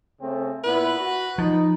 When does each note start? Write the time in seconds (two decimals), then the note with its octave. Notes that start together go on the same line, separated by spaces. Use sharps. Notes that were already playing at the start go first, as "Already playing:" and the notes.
0.21 C#3 A3 C4
0.64 A#2 B3 E4 B4
0.97 F#4
1.38 F3 D#4